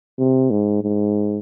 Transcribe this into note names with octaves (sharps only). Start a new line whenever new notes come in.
C3
G#2
G#2